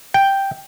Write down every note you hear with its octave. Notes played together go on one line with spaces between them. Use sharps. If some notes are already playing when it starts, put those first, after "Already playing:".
G5